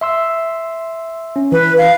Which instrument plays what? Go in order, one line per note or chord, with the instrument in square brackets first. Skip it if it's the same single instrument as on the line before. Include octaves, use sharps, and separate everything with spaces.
[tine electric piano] E5 C6 E6
C#4
[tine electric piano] E3 [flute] B4
[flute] F5